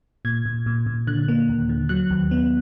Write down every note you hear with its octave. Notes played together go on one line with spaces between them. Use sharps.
A#2 G#6
A#2
A#2
A#2
D3 F#6
A#3
D#2
D3
F#3 F#6
D#2
B3